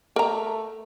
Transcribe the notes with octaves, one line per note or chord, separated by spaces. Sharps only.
A3 A#4 A#5